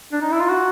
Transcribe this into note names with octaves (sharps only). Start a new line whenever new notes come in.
D4
D#4
E4
F4
F#4